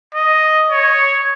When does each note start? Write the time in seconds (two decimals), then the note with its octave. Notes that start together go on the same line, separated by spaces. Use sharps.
0.15 D#5
0.70 C#5